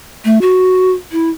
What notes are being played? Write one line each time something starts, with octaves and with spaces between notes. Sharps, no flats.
A3
F#4
E4